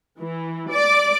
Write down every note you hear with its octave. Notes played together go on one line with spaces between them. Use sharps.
E3
D5 D6